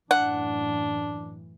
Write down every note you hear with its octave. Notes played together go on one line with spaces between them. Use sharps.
F#2 A2 E3 D4 F#5